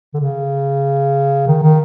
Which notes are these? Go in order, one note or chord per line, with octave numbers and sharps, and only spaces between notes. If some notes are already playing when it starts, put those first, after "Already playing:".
D3
C#3
D#3
D#3